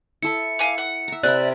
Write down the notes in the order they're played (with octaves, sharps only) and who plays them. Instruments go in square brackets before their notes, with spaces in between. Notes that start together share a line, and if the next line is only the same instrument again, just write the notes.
[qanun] E4 A4 E5 [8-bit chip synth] C#7
[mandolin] F5 G#5 D6
F#5
[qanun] E5 A#5
[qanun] C3 A#4 B5 [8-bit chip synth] D5 [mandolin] F#6